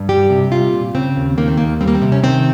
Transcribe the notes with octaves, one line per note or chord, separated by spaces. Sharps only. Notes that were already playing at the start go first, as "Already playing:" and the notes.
Already playing: G2
G3 G4
C3
G3 F4
A#2
C#3 C4
D#2
D#3 A#3
C4
D#2 A#3
G3 C4
A#3
C4
C3
C#4
D#3 C4